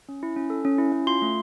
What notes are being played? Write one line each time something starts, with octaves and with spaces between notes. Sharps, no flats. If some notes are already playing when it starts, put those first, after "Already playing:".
C#4
E4
C#4
A4
C#4
E4
C#4
F4 C6
A3